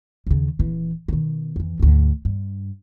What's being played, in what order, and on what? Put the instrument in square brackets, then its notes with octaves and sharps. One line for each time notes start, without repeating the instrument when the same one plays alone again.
[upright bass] D#2 C#3
D#1 E3
B2 D#3
F2 E3
D2 G#2
G2